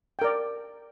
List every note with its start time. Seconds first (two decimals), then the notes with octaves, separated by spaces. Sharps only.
0.19 G5
0.22 A#4
0.24 D5